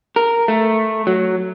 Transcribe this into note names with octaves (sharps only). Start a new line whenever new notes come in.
A#4
A3
F#3